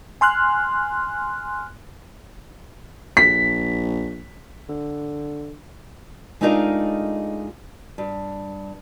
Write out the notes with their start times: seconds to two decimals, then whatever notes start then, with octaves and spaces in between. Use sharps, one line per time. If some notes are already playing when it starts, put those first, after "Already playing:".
0.21 G#5 C6 F6 F#6
3.17 A#1 B6
4.69 D3
6.41 G#3 A3 D4 D#4 F4 A#4
7.98 G2